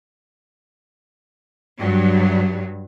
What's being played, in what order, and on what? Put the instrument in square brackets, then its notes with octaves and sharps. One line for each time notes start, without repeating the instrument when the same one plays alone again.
[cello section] G2 F#3